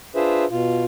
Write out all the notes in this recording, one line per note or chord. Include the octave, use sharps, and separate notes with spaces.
D4 F4 G#4 B4 C5 E5
B2 F4